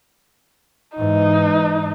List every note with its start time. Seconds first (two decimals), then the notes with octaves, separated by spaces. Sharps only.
0.97 G#2 E3 D#4